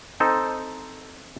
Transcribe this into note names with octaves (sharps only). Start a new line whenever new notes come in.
C4 D#4 A4 C5